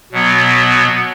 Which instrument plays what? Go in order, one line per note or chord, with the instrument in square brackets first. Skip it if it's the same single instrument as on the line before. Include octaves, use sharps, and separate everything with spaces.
[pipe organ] B2 F#3 B3